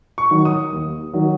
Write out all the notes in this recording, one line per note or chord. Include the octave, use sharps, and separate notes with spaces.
C#6
D#3 F#3
D#6
D#2
D#3 F#3